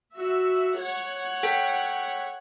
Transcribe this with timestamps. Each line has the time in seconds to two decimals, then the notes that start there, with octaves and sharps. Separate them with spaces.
0.16 F#4 E5
0.78 C#5 F#5
1.43 A4 G5 B6